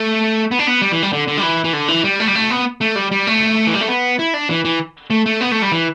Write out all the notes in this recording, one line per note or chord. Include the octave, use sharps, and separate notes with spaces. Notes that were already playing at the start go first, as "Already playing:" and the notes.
Already playing: A3
B3
D4
B3
G3
E3
G3
D3
D3
G3
E3
E3
D3
E3
G3
A3
G3
A3
B3
A3
G3
G3
A3
E3
G3
A3
B3
E4
D4
E3
E3
A3
A3
B3
A3
G3
E3